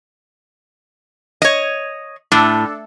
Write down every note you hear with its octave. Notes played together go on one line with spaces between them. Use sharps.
C#5 D#5
A2 D4 A4